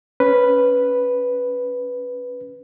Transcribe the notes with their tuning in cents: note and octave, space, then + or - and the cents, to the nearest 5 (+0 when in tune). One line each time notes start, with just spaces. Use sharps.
C#4 +0 B4 +0